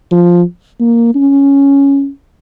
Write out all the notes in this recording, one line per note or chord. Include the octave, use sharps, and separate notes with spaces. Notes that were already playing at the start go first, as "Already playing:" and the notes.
F3
A#3
C#4